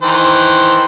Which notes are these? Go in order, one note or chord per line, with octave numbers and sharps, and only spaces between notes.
D#3 E3 C5